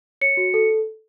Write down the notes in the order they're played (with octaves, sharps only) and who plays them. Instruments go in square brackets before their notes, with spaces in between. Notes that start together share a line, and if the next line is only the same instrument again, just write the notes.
[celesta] C#5 C#7
F#4
A4